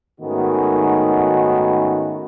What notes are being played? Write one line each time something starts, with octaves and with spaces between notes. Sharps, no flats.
G#2 D#3 A3 B3 C#4 F#4